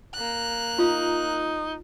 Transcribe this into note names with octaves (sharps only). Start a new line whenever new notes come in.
A#3 F#6
D#4 F4